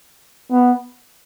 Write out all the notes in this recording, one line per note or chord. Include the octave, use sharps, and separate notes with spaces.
B3